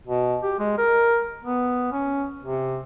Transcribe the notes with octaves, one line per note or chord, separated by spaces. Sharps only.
B2
G4
G#3
A#4
B3
C#4
C3